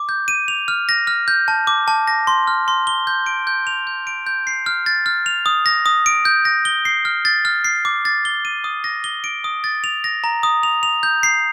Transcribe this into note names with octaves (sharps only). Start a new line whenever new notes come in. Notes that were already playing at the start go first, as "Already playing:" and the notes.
Already playing: D6
G6
D#7
F7
F6
A#6
F6
G6
A5
D6
A5
A#6
C6
F6
C6
G7
G6
D7
G6
F7
G6
D7
G6
C7
F6
A6
F6
F7
D#6
A#6
D#6
D7
G6
A#6
G7
C7
F6
A6
F6
C7
D6
A6
G7
D#7
D#6
A#6
G7
D7
D#6
A6
F7
A#6
A#5
D#6
F7
F7
G6
C7